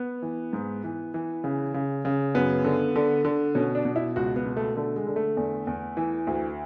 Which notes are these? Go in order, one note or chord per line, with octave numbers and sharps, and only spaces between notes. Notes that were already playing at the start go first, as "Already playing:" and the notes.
Already playing: B3
E3
G#2
E3
E3
C#3
C#3
C#3
F#2 B3
D3
D3
D3
B2 C#4
D4
B2
E4
C#2 F#4
B3
B2
A3
D3 A3
G#3
D3
A3
E2
E2
E3
D2